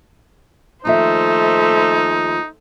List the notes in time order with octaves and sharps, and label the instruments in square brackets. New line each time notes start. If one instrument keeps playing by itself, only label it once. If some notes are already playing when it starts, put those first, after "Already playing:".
[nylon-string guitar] D#2 F3 E5 [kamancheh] A3 C5 [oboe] D#4